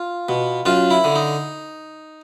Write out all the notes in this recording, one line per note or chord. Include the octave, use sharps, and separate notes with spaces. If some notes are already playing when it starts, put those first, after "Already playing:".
Already playing: F4
B2
F#2 F4
E4
D3
D#4